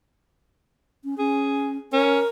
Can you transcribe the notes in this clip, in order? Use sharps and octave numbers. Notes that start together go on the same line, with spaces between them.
C#4
C#4 G#4
C#4 A#4